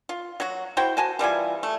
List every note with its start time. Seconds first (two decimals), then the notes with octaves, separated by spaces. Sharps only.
0.09 F4
0.40 F#3 F#4
0.77 E4 F#4 C5 G5
0.97 F#4 G#5 A5
1.19 E3 G3 F4 G#5
1.63 A3